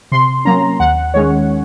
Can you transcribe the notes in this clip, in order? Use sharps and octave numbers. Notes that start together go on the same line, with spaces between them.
C3 C6
F#3 A#3 C#4 A#5
D#2 F#5
D#3 G#3 C#4 C#5